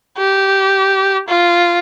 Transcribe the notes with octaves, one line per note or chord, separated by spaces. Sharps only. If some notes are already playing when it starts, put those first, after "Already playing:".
G4
F4